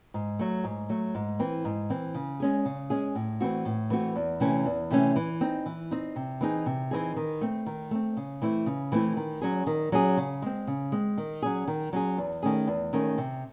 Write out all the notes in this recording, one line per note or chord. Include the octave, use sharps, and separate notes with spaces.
G#2
F#3 A3
G#2
F#3 A3
G#2
E3 C4
G#2
E3 C4
C#3
G#3 C#4 G#4
C#3
G#3 C#4 G#4
A2
E3 A3 C4 F#4
A2
E3 A3 C4 F#4
E2
C3 E3 A3 C#4
E2
C3 E3 A3 C#4
E3
C4 D#4
E3
C4 D#4
C3
E3 C4 D#4 G#4
C3
E3 C4 D#4 G#4
D#3
A3 C4
D#3
A3 C4
C#3
E3 A3 C4 E4
C#3
E3 A3 C4 E4
D#3
F#3 C#4 G#4
D#3
F#3 C#4 G#4
C#3
G#3 C4
C#3
G#3 C4
D#3
F#3 C#4 G#4
D#3
F#3 C#4 G#4
E2
D#3 A3 C#4 G#4
E2
D#3 A3 C#4 G#4
C3